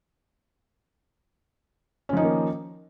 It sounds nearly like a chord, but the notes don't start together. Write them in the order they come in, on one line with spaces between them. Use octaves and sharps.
C#4 F3 D#4 D#3 A#3